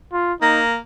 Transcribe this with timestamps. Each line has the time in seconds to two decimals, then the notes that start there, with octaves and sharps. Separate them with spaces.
0.13 F4
0.41 A#3 D#4